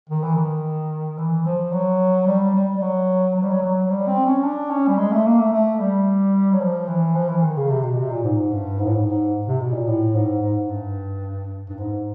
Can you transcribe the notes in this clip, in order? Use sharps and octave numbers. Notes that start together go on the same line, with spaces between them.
D#3
E3
D#3
E3
F3
F#3
G3
G3
G3
F#3
F#3
G3
F#3
F#3
G3
C4
C#4
D4
C#4
G3
G#3
A3
A#3
A3
A3
G3
F#3
F3
E3
F3
E3
D#3
C#3
C3
B2
C3
A#2
G#2
G2
G#2
A2
G#2
G#2
C3
B2
A#2
A2
G#2
G#2
G2
G2
G#2